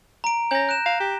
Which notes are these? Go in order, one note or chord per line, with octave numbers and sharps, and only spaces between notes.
A#5 D7
C#4 G6 A#6
F#6 D7 E7
F5
G4